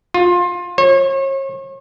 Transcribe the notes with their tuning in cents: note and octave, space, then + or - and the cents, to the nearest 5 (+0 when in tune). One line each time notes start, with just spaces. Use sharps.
F4 +20
C#5 -40